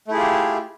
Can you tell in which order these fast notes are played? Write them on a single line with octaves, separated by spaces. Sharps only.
A3 E4 G#4 F4 G4